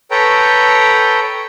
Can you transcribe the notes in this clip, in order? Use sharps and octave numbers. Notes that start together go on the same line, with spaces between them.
A4 B4 C#5 G5 A#5